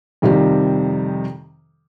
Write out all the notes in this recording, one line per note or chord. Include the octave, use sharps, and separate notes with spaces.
F2 C3 D#3 F3 G3